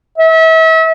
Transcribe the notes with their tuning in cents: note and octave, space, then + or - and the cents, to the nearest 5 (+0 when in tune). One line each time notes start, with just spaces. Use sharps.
E5 -35